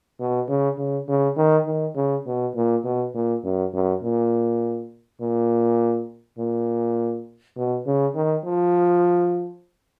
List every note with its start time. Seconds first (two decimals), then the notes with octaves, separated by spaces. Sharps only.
0.20 B2
0.48 C#3
0.78 C#3
1.08 C#3
1.37 D#3
1.66 D#3
1.95 C#3
2.26 B2
2.55 A#2
2.84 B2
3.14 A#2
3.44 F#2
3.73 F#2
4.02 A#2
5.21 A#2
6.38 A#2
7.57 B2
7.86 C#3
8.15 D#3
8.45 F3